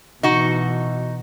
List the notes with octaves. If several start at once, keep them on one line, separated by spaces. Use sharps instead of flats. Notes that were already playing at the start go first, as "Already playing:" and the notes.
B2 E3 D#4 F#4